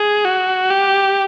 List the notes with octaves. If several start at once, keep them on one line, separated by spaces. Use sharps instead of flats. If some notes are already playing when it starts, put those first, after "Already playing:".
Already playing: G#4
F#4
G4